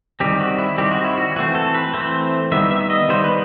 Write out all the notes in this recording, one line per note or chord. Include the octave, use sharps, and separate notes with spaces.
D#3 G3 C4 G4
F#4
E4
D#3 G3 C4 G4
F#4
E4
F#4
E3 A3 C4 F#4
A4
B4
E3 A3 C4 C5
D#3 G3 B3 E5
E5
D#5
D#3 G3 B3 C5
B4